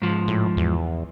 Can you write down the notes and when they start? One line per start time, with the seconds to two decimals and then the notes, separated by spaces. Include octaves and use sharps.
0.02 G#2 F3
0.28 A2
0.57 E2